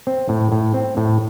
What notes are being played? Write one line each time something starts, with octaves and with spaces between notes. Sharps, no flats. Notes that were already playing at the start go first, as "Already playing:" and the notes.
C4
A2
A2
C4
A2